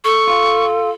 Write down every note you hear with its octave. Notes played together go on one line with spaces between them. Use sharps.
A4 C#6
F4